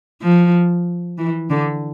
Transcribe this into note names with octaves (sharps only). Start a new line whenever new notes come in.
F3
E3
D3